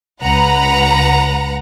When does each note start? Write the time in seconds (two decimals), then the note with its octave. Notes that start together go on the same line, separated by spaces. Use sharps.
0.23 C#2 B4 F#5 A#5